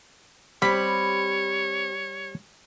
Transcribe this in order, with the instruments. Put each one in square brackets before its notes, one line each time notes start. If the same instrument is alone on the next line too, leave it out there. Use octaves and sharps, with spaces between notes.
[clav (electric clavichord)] G3 [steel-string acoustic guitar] C4 G4 [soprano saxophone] C#5 [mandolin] B5